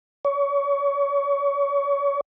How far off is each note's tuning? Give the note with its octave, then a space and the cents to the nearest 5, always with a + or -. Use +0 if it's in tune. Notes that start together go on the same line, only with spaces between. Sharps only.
C#5 +30